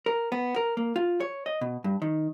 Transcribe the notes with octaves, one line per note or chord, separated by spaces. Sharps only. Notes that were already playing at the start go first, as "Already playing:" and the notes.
A#4
B3
A#4
A#3
F4
C#5
D#5
B2
G2
D#3